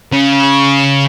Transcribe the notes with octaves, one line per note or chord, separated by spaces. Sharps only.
C#3